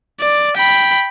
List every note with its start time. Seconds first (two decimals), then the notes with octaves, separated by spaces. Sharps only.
0.20 D5
0.57 G5 B5